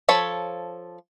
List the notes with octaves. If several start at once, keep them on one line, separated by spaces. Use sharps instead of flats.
F3 A4 C#5 B5